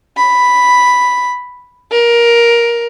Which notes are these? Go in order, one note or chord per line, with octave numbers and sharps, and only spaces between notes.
B5
A#4